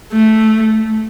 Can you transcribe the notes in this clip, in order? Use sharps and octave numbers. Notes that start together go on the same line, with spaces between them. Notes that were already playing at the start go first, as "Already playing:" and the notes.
A3